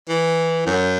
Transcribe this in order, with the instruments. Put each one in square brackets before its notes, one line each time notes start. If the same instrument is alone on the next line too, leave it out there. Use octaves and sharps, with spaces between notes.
[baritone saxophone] E3
F#2